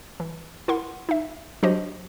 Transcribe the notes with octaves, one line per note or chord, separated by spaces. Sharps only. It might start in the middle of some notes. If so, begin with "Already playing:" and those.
E3
E4 A#4 F#5 C6
D#4 E5
F#3 D4 F#4 G4 C5 D#5